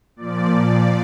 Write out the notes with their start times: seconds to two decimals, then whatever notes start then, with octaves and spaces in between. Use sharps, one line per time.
0.16 A#2 F3 D5
0.48 D5